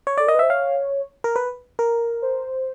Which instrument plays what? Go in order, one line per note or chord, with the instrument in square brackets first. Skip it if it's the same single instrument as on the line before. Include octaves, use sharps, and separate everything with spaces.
[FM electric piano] C#5
[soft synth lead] A4 [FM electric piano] D5
[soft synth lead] A#4 [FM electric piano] D#5
[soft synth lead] B4
[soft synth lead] C5 [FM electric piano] E5
[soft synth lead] C#5 [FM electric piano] F5
[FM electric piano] A#4
B4
A#4
[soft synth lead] C5